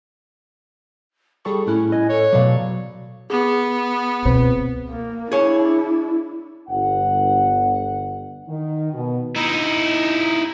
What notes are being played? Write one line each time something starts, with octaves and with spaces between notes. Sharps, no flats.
G3 G#4 A4 C#6
A2 A3 C#4 E4 F#6
D#5 G#5
A4 C#5
B2 F#3 D5 F5
B3 G#4
C#2 B2 C4 B4
A#3
D4 E4 G#4 C#5
G1 F#5
D#3
B2
D#4 E4